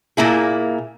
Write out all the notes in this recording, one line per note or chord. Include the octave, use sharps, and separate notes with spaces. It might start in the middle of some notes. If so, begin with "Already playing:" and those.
A#2 A#3 E4 G#4